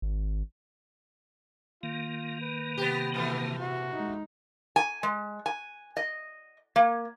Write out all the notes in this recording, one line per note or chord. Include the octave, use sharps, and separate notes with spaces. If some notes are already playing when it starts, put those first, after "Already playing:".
G#1
D#3 A#3 F4
B4
C3 B3 G4
A#2 E3 A3 B3
F#4
G#3 D#4
G#5
G#3
G#5
D#5
A#3